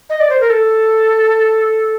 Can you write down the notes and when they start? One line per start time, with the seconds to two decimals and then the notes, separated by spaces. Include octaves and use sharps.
0.10 D#5
0.20 D5
0.30 C5
0.40 A#4
0.50 A4